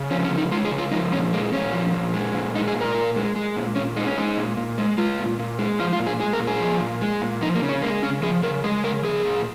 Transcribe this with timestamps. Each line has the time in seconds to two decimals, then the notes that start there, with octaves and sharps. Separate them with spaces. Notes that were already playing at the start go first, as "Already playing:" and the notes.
Already playing: C#3
0.10 F3 C#4
0.24 C#4
0.31 C#3
0.38 D#4
0.51 G#3 F4
0.65 G#4
0.71 C#3
0.78 F4
0.92 F3 D#4
1.12 A#2 C#4
1.33 G#3 A#3
1.53 A#2 C#4
1.73 F3
1.94 A#2
2.14 G#3
2.34 A#2
2.55 G#3 D#4
2.68 G#4
2.75 A#2
2.81 A#4
2.94 A#2
3.16 G#3
3.36 G#3
3.56 A#2
3.76 A#2 C#4
3.96 G#3 D#4
4.07 C#4
4.17 G#3 D#4
4.38 A#2
4.57 A#2
4.78 G#3
4.98 G#3 F4
5.19 A#2
5.39 A#2
5.59 G#3
5.79 F3 F4
5.93 F4
5.99 A#2
6.07 G#4
6.20 G#3 G#4
6.33 A#4
6.40 A#2
6.47 G#4
6.60 F3
6.80 A#2
7.01 G#3
7.22 A#2
7.41 F3 D#4
7.55 A#3
7.62 C#3
7.69 C#4
7.82 G#3 A#3
8.03 C#3 C#4
8.22 F3 G#4
8.43 C#3 A#4
8.64 G#3 G#4
8.84 C#3 A#4
9.04 F3 G#4
9.25 A#2